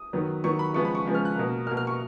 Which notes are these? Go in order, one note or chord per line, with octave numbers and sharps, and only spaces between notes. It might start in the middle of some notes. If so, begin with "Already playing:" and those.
Already playing: D#6
D#3 F#3 B3
D#3 F#3 B3 C#6
B5
C#3 F3 G#3 B3 C#6
B5
C#6
C#3 F3 G#3 B3
F6
F#6
B2 A#3
B2 A#3 F6
F6
C#6